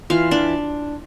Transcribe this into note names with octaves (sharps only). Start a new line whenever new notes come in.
E3 F4 F5
E3 D4 D5